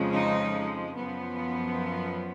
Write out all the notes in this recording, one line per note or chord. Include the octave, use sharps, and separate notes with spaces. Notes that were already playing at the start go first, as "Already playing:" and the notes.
Already playing: F2 C#3 F3 G#3
D#4
F#2 F3 B3